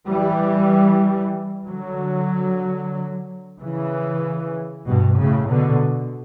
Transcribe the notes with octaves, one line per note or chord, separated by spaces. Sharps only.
E3 G3
D3 F#3
C#3 E3
G2 B2
A2 C#3
B2 D3